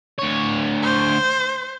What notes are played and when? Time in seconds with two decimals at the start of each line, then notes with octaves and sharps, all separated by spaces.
0.19 D2 C#5
0.83 C5